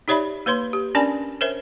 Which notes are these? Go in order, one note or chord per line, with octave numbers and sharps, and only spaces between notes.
D#4 G4 C#5 D5 E5 B5
A#3 B4 C#5 C6
G4
C#4 D4 A#4 D5 G#5 B5
A#4 C5 C#5 E5